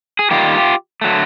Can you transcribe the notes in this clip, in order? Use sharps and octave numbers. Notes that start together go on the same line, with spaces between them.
G#4
D#3 G3 A#3 F4 G4
D3 F#3 A3